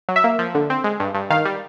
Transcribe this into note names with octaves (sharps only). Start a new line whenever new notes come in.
F#3
E5
A#3
F3
D3
C4
G#3
G2
G2
D#3 F5
G3